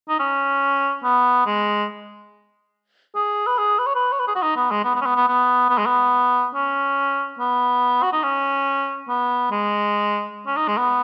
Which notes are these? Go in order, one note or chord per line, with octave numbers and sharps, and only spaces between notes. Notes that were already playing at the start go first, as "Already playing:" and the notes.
D#4
C#4
B3
G#3
G#4
B4
G#4
B4
C#5
B4
C#5
B4
G#4
F#4
D#4
B3
G#3
B3
B3
C#4
B3
B3
B3
B3
G#3
B3
C#4
B3
F#4
D#4
C#4
B3
G#3
C#4
D#4
G#3
B3